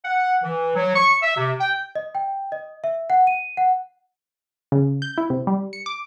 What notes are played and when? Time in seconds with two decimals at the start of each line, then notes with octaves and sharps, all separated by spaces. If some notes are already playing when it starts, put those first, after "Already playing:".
0.05 F#5
0.43 E3
0.76 F#3
0.96 C#6
1.23 E5
1.37 C3
1.61 G5
1.95 D#5
2.15 G5
2.52 D#5
2.84 E5
3.10 F#5
3.27 D#7
3.57 F#5
4.72 C#3
5.02 G6
5.18 E4
5.30 C3
5.47 G3
5.73 C#7
5.86 D6